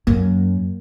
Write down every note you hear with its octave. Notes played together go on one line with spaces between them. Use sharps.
F#2 A#3